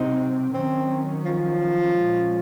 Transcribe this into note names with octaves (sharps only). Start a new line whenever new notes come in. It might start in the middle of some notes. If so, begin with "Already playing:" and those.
Already playing: C3 F#3 C4 D#4
D#3 F#3 C4 C#4
F3
A#2 G#3 C#4